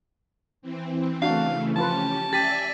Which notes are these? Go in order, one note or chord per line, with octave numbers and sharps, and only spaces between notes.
E3 C4
C#3 E3 A3 D4 F#4 F5
F3 C#4 F4 G4 B4 A5
G4 D5 E5 G#5 A6 B6 D#7